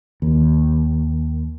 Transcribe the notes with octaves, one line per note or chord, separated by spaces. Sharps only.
D#2